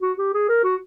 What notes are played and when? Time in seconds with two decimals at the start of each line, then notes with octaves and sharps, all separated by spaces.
0.02 F#4
0.18 G4
0.34 G#4
0.49 A#4
0.64 F#4